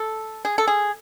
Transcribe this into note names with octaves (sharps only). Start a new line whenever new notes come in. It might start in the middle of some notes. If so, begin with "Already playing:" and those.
Already playing: A4
G#4
A4
G#4